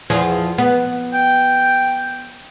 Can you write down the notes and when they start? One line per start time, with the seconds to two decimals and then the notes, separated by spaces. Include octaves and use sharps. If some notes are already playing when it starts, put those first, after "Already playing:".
0.10 E2 F3 G#4
0.58 B3
1.14 G5